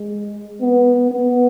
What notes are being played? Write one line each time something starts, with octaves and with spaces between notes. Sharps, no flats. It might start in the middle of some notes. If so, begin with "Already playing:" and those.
Already playing: G#3
B3
B3